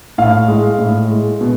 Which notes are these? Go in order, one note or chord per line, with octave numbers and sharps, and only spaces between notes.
A2 F5
G#3
A2
G#3
B2